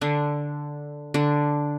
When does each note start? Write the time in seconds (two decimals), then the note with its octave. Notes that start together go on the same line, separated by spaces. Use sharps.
0.01 D3 D4
1.14 D3 D4